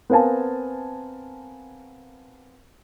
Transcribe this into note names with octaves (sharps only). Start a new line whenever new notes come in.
B3 C4 A#4 F5 G#5 A5